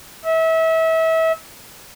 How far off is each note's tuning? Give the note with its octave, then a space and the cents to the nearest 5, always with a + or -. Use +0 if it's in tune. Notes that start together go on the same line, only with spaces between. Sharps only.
E5 -30